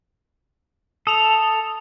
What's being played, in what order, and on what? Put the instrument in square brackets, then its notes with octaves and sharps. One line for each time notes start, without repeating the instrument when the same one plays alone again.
[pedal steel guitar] A4 [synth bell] D#6 F7